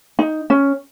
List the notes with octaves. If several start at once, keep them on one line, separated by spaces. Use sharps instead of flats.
D#4
C#4